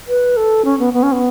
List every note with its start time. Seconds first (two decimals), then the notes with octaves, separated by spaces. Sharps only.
0.08 B4
0.37 A4
0.65 C#4
0.79 B3
0.93 B3
1.03 C#4
1.12 B3